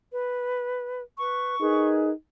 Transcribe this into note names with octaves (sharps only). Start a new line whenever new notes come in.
B4
B4 C#6
D#4 G#4 A#4 B4